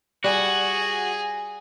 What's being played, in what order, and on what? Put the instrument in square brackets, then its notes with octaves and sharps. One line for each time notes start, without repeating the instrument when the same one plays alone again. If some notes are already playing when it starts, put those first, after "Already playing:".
[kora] G3 [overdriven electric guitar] F#4 [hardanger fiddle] G#4